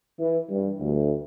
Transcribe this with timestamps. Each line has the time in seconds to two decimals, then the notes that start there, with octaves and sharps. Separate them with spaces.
0.19 E3
0.50 G2
0.80 D2